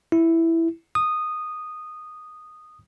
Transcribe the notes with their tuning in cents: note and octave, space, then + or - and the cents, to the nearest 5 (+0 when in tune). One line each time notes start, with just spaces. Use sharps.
E4 +0
D#6 -10